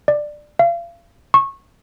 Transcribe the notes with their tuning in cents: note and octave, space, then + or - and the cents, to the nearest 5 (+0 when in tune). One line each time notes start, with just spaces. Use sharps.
D5 +15
F5 -35
C#6 -20